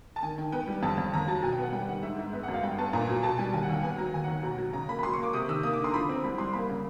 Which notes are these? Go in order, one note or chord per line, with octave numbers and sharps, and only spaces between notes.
A5
D#3 G#5
D#3 G5
B3 G5
G3
F2 A5
F2
D#2 A#5
F#3 A5
B2 G#5
G5
B3 F#5
G3 G5
D#3 F#5
G#2 E5
G#2 E5
B3 E5
F#5
F#2
F5
G2 G5
B3 A5
A#2 A#5
F#3
B2 A5
G3 G#5
D#2 G#5
F#5
D#2 G5
B3 G#5
F#3 A#5
D#2 G#5
F#5
D#2
B2 A#5
F#3
C#3 A#5
A#3 B5
B5
F#3 C6
C#6
A#3 D6
C3 D#6
D#3 E6
A#3 D#6
D6
D3
C6
A#5
F3 B5
C4
C2 B5
G3 C6
A#3 B5
C#3